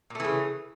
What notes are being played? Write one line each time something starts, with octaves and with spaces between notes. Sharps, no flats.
A#2 C#3 E3 A3